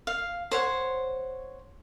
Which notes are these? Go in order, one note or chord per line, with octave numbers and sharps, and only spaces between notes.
F5
C5 C#5 F#5